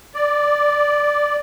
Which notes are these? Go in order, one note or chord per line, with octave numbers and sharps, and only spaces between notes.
D5